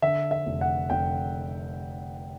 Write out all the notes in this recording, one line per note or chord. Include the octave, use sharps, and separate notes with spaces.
D3 E5
E5
F1
F#5
F1 G5